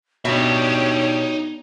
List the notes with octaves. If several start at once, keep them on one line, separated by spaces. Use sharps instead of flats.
B2 D4 D#4 G4 C#5 E5